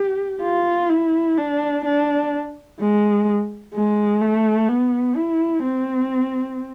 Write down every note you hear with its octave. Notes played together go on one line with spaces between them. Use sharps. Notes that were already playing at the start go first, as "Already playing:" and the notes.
Already playing: G4
F4
E4
D4
D4
G#3
G#3
A3
B3
E4
C4